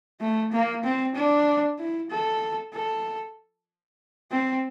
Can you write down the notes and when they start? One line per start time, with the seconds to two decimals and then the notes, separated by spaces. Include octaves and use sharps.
0.21 A3
0.52 A#3
0.84 C4
1.15 D4
1.78 E4
2.10 A4
2.73 A4
4.32 C4